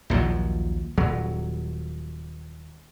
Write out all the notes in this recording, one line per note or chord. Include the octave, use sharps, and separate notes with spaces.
A#1 D#2 F3 F#3
D#1 F#3